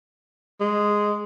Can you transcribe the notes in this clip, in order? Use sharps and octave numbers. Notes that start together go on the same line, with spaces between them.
G#3